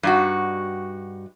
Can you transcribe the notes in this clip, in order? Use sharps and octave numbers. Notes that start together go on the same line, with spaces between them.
G2 D#4 F#4